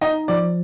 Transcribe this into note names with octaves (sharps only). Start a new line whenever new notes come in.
D#4 D#5
F3 D5